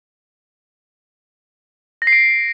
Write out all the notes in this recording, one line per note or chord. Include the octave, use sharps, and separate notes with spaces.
A#6
C7
D7